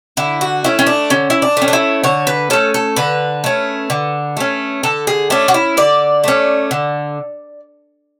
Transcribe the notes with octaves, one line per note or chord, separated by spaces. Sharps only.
D3 E4
F#4
A3 C#4 E4
C#4
D4
D3 C#4
E4
D4
A3 C#4
D4
E4
D3 C#5
B4
A3 C#4 A4
A4
D3 B4
A3 C#4
D3
A3 C#4
D3 A4
G#4
A3 C#4 D4
F#4
E4
D3 D5
A3 C#4
D3